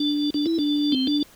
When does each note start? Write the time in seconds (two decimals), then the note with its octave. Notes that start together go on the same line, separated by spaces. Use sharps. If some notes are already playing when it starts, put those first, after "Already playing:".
Already playing: D4
0.34 D4
0.46 E4
0.59 D4
0.92 C4
1.07 D4